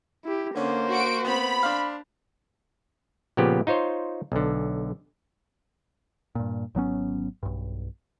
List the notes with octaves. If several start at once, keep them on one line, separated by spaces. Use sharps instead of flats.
E4 G4
D3 A#3 C#4 C5
F#4 D7
B3 C4 B5
D4 C5 F5
A#2 C#3 F3 B3 G4
D#4 F4 C5 C#5
B1 D3
G2 A#2
G#1 F#3 B3 C#4
B1 G2